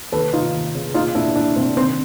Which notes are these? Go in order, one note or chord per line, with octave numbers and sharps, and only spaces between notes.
D#2 A4 B4
D#2 D#4 F4
D#2
C#3
A#2 D#4 F4
A#2 D4 E4
A#2 D4 E4
A#2 C4
D#3 C4